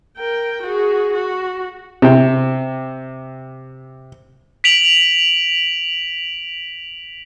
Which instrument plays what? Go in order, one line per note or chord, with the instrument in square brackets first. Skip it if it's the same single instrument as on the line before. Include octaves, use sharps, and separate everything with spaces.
[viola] A#4 G5
F#4 G#4
F#4
[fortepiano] C3 G5
[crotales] B6 D7 F7 F#7